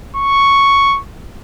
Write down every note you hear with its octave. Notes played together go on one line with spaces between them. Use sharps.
C#6